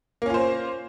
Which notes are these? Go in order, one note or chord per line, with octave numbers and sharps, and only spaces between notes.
A#3 C#4 F4 C5